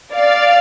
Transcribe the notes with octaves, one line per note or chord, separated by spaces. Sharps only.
D5 F5